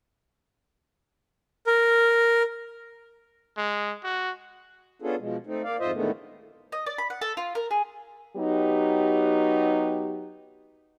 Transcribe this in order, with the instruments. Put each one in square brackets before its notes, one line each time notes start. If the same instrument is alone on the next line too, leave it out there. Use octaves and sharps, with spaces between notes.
[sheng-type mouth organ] A#4
[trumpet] G#3
F#4
[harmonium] B3 C#4 D4 F4 G#4 A4
B2 F3 G#3
A3 C4 D#4
A#3 D5 F5
F2 G#2 F4 C5 D#5 E5
A2 D3 D#3 G#3 A3 B3
[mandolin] D#5
D5
B5
F#5
A4
F4
A#4
G#4
[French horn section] F#3 B3 D#4 G4